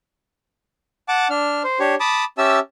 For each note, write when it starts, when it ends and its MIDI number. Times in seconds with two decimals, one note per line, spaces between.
1.08 1.28 78
1.08 1.28 81
1.08 1.28 86
1.30 1.63 62
1.30 1.63 89
1.64 1.79 72
1.80 1.95 62
1.80 1.95 67
1.80 1.95 73
2.00 2.24 81
2.00 2.24 83
2.00 2.24 86
2.00 2.24 87
2.38 2.59 61
2.38 2.59 67
2.38 2.59 76
2.38 2.59 81
2.38 2.59 88